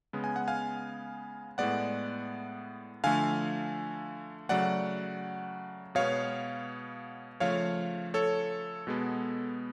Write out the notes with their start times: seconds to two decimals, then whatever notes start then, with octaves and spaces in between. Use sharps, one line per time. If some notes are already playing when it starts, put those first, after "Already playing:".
0.13 C#3 G#3 B3
0.24 G#5
0.36 F#5
0.48 F5 G#5
1.58 A2 G#3 B3 D5 F#5
3.04 D3 F3 A3 F5 G#5
4.49 C#3 F#3 A3 D5 F#5
5.95 B2 G#3 B3 C#5 F5
7.40 C#3 F3 A3 C#5 F5
8.14 A4 C#5
8.87 B2 G#3 B3